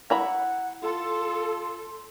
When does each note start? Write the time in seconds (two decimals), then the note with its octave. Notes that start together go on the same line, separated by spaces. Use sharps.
0.10 E4 F#5 A#5 B5
0.83 F4 A4 C6